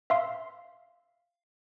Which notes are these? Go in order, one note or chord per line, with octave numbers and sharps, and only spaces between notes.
E5 F5 C6